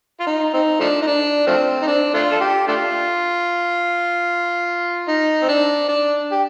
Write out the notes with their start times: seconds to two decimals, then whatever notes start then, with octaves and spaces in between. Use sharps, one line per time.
0.20 F4
0.27 D#4
0.54 C4 D#4
0.80 F3 A3 D4
1.02 D#4
1.07 D4
1.47 F3 A3 C4
1.82 D#4
1.87 D4
2.14 A3 D4 F4
2.31 A4
2.41 G4
2.68 A3 D4 F4
5.08 D#4
5.43 C4
5.49 D4
5.89 D4
6.31 G4